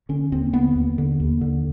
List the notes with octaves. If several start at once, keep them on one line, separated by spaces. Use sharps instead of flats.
D3 C#4
D#2 C4
D3 B3
D#2
D3
D#2
D3